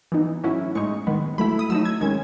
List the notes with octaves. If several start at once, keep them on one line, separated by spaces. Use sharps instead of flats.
E3 B3 D#4
A2 F#3 C#4 E4
A2 G#3 D#4 C#6
D#3 G#3 B3
F#3 A3 E4 B5
D#6
F#3 A3 D#4 E6
G#6
D#3 G#3 C#4 G#6